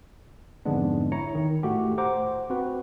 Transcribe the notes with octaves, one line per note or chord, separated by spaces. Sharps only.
F2 G#2 D3 G#3 B3 D4
E4 C#5 A#5 C#7
D#3
A2 A3 F#4 G4
C5 F#5 A#5 D6
C4 F#4 B4